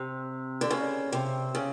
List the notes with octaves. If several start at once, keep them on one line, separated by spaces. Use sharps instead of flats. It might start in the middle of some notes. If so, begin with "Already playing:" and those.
Already playing: C3
D3
C#3
C3
C#3